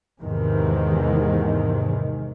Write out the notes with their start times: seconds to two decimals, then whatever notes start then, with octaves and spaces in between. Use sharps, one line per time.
0.22 E2 G#2 C3 D#3